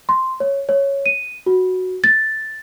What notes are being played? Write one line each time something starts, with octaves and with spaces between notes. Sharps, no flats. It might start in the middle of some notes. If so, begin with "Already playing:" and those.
C6
C#5
C#5
D#7
F#4
A6